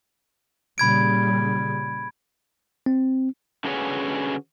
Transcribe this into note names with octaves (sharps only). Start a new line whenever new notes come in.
A#2 C#3 G3 B5 G#6 D7
C4
D3 C#4 F#4 G#4 B4 C#5